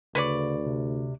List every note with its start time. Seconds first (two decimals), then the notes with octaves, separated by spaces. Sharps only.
0.15 D2 C#3 B4 C#5 D5
0.66 C3